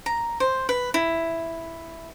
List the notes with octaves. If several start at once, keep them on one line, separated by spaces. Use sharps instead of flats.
A#5
C5
B4
E4